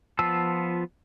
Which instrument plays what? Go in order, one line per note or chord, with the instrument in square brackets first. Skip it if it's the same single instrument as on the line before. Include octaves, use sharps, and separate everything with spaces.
[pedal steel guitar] F3 B3 F4 A5 E6